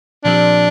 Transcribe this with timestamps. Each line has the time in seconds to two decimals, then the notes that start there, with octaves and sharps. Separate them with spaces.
0.25 A#2 F3 C4 D4 G4 D5